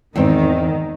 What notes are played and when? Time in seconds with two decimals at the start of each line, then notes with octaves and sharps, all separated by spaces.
0.16 E2 G#2 D#3 C4